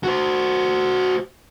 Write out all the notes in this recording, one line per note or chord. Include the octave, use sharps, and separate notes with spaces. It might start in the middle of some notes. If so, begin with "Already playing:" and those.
F#4 C5